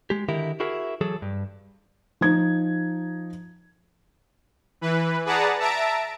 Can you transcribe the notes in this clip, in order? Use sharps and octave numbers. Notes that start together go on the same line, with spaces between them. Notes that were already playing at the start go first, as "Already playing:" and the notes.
G#3 G4
D3 D#3 E4 G4 A#4
E4 F#4 G#4 A#4 E5
E3 F#3 G#4 A4
G2
F3 D#4 G#6
E3 B4
G#4 B4 D5 F#5 A5 A#5
E5 A5 A#5 D7